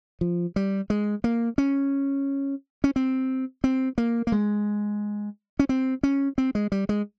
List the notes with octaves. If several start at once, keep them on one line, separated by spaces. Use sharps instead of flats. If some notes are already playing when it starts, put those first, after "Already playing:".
F3
G3
G#3
A#3
C#4
C#4
C4
C4
A#3
A#3
G#3
C#4
C4
C#4
C4
G#3
G3
G#3